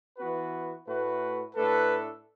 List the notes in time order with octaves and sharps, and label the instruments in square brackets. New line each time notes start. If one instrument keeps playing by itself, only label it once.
[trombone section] E3 B3 F#4 B4
A2 A3 F#4 B4
[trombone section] A2 A3 D4 A4 [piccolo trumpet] B4